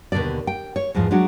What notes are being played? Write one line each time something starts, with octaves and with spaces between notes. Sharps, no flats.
D#2 B2 D3 A4 D5
G5
C#5
E2 G#2 F3 G#3
F#3 G#3 D4 F#4